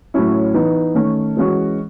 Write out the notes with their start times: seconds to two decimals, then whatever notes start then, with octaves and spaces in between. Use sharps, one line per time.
0.14 A2 F#3 C#4 E4
0.54 E3 B3 D#4
0.95 D#3 A3 C#4
1.37 E3 G#3 C#4 F#4